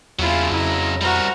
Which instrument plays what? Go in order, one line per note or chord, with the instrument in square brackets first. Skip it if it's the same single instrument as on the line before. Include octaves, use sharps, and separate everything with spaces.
[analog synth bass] E2 [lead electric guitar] C#3 F#3 [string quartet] E4 G#5 [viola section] F4
[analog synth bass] F2 [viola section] E4 [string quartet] D#5 A#5
[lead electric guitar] G3 A#4 [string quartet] E4 F#4 C5 [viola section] A#5